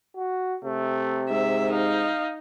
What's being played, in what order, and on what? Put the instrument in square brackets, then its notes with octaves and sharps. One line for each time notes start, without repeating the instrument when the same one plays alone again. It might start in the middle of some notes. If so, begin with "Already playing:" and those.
[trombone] F#4
[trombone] C3 [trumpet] A3
[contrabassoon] G#2 [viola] E5
[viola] D#4 [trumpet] F5